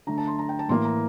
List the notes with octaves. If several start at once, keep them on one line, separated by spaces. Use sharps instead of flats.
D3 A3 A#5
A5
C6
A#5
G5
A5
A2 E3 A#3 C6
A#5